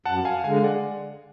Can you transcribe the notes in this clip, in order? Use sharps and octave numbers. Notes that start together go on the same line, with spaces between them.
F#2 F#5 A5
F5 G#5
D3 G#3 F5 G#5
D5 F#5